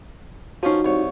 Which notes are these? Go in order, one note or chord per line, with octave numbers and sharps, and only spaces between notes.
F3 C#4 D#4 F#4
C2 C#5